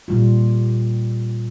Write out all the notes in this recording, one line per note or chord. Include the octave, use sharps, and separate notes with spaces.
A#2 G3 F4